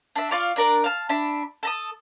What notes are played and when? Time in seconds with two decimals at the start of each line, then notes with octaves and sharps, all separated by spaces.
0.16 D4 E5
0.30 F4 D5 F5 C#6
0.56 D4 A#4 D5
0.84 F5 A5
1.09 D4 E5 B5
1.63 A4 A#5 D#6